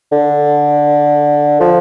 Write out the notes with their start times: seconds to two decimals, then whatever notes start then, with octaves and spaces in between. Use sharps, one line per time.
0.12 D3
1.61 F3